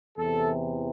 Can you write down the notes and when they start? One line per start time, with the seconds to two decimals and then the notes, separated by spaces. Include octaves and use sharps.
0.17 E2 C3 E3 A4